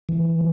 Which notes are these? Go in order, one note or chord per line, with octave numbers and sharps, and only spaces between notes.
E3